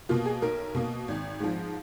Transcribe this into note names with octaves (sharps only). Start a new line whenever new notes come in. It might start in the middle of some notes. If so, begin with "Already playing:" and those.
B2 A#3 F4
G#4
B1 A#4
B2 A#3
G#1
G#2 F3